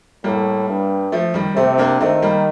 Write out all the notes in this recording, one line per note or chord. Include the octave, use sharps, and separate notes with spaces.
A2 G3 A#3
G2
F3 A3
D#3 G3
C3 A3 C4
A#3 D4
D#3 A3 C4
G3 A#3